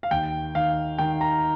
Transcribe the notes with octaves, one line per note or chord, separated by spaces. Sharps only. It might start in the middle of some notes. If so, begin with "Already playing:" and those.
F5
D#2 G5
D#3 F5
D#3 G5
A#5